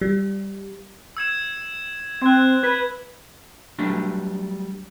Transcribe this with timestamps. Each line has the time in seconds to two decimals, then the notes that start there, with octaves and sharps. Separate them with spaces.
0.01 G3
1.17 E6 G#6 E7
2.21 C4 F#6 G#6
2.63 B4 G#6
3.79 F#3 G3 A3 D4